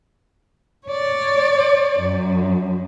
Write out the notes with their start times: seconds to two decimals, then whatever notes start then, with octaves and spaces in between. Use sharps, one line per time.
0.87 C#5 D5
2.00 F#2